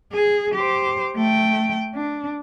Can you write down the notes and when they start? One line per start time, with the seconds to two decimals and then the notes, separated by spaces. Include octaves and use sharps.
0.12 G#4
0.54 G4 C5
1.16 A3 G5
1.95 D4